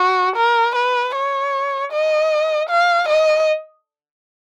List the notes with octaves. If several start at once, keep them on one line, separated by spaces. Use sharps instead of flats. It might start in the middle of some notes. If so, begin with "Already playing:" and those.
Already playing: F#4
A#4
B4
C#5
D#5
F5
D#5